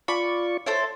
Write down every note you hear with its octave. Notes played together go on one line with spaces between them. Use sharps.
F4 D5 B5 C#6
E4 A4 C5 C#5